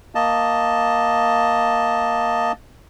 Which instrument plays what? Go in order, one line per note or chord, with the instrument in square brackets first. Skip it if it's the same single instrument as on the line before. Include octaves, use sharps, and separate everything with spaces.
[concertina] A#3 D#5 A5